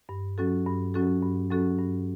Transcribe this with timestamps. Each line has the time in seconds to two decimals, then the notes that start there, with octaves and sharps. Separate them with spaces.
0.09 G2
0.38 F#3 C#4 F#4 A4
0.66 G2
0.94 F#3 C#4 F#4 A4
1.22 G2
1.50 F#3 C#4 F#4 A4
1.79 G2